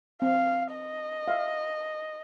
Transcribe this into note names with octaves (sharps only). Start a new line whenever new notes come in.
C4 F5
D#5
E5 F5